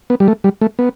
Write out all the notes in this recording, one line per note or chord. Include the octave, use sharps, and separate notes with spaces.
B3
G3
A3
G3
A3
B3